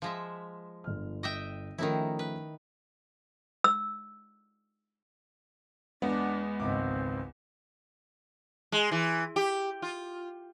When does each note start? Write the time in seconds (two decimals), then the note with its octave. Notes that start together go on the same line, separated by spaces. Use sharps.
0.02 F3 G#3 E5
0.84 G1 F6
1.23 D#5 E5 G5
1.78 D#3 F3 A3 C#4 D#4 E4
2.19 B4
3.64 E6
6.02 E2 G#3 B3 D4
6.60 G#1 C#2 C4 D6
8.72 G#3
8.92 E3
9.36 G4
9.82 F4